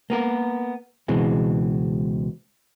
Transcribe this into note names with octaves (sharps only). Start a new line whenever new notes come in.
A#3 B3 A#4
C#2 B2 E3 G#3 C4